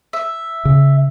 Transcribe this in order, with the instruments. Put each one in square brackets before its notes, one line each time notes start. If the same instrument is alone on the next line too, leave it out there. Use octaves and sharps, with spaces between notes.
[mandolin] E5
[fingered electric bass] C#3